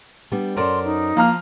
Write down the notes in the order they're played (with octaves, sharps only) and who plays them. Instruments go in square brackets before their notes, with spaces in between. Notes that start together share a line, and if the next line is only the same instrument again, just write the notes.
[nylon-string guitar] G3 B3 D4
[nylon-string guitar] F#2 A4 C5 [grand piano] A#4 D5 [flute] C6
[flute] D#4
[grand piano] F3 A#5 F6 [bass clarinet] A#3